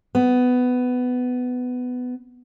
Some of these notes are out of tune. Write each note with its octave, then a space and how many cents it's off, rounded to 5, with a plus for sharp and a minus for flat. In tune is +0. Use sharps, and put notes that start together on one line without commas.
B3 +15